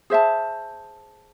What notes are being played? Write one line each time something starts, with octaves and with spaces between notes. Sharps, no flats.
G#4 C5 E5 A5